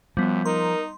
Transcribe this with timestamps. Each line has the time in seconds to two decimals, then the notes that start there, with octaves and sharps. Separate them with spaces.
0.17 F#2 F3 G3 B3
0.45 D#4 A#4 C6